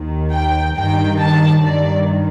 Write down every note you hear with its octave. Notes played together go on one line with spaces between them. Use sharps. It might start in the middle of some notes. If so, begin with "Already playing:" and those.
Already playing: D#2 D#3
G5
G2 D#3 G5
A5
G2 D#3 D5